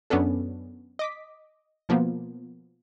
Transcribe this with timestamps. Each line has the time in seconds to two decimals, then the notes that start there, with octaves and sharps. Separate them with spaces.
0.10 F#2 B3 C#4 D4 A4
0.99 D#5 D6 B6
1.89 B2 F3 A#3 B3